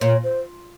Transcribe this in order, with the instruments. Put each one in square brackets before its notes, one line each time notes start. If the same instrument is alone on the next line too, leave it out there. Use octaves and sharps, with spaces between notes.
[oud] A#2 [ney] C#5
[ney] C5